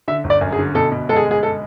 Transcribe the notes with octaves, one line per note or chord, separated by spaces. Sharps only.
D3 E5
G1
D5
F#2
G#4
D3
B2 A4
B2
G#3 A4
G#4
G#3
G#4
A4